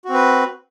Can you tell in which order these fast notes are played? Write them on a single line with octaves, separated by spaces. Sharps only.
F#4 C4 B4